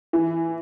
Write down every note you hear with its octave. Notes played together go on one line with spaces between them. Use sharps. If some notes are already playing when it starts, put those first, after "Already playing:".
E3